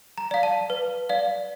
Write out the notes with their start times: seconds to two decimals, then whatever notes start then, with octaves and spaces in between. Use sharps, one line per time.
0.18 A#5
0.31 D5 F5
0.43 A5
0.70 B4
1.09 D5 F5